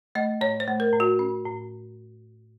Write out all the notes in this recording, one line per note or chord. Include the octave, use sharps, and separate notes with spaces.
A3 D#5
A2 C#5
C5
A3
A#4
A2
F#4
C#4
A2